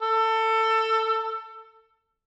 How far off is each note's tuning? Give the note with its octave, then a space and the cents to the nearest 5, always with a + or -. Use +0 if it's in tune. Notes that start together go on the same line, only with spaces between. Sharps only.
A4 +20